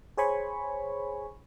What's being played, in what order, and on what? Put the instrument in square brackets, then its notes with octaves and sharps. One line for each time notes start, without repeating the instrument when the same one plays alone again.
[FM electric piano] G#4 C5 C#5 G#5 B5 C#6